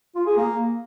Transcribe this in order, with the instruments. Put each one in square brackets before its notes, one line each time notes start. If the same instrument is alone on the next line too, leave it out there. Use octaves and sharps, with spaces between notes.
[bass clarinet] F4
G#4
A#3